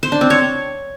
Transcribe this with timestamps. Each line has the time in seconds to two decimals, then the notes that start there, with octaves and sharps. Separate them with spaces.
0.03 C5
0.12 D4
0.21 C4
0.30 C#5